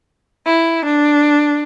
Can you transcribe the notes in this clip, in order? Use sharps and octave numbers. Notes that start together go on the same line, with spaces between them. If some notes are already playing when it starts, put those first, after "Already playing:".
E4
D4